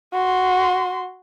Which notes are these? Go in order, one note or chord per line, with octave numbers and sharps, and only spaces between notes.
F#4 C6